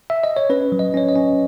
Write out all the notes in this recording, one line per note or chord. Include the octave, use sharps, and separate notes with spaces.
E5
D#5
C#5
C#4 B4
F#3
D#5
C#4 C#5
D#5
C#4